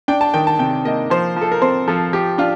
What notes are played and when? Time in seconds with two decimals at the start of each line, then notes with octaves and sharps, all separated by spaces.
0.08 D4 G5
0.21 A5
0.34 D#3 G5
0.47 A5
0.59 C3 G5
0.85 A#3 D#5
1.10 F3 C5
1.36 F3
1.42 A4
1.52 A#4
1.62 C4 C5
1.88 F3 A4
2.13 F3 G4
2.38 D4 F4